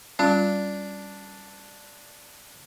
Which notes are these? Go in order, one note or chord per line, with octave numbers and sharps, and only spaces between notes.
G3 C#4 D4 F4